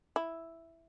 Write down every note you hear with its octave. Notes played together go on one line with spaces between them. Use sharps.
E4